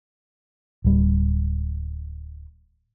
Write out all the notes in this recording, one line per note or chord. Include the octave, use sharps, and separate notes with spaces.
D1 G3